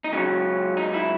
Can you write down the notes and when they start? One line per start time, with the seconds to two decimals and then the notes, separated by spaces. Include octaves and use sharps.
0.04 D#4
0.12 C#2 C#3 F#3 C#4
0.77 D#4
0.94 E4